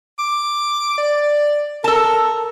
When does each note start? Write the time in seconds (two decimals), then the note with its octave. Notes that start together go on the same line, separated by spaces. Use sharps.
0.19 D6
0.98 D5
1.84 A4 A#4 A5